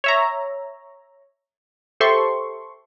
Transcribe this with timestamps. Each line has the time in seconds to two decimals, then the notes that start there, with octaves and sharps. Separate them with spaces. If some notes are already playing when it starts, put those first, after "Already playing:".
0.04 C#5 E5 A#5
2.00 G4 A4 C5 E5 C6 C#6